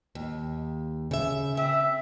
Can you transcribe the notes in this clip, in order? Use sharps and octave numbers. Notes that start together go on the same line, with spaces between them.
D#2
C#3 E5
C4 E5